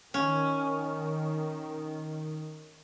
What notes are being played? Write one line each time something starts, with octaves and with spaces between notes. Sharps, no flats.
D#3 C#4